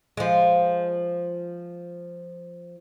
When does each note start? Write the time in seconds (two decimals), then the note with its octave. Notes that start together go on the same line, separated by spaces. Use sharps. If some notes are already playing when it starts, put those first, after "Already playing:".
0.17 F3 G#3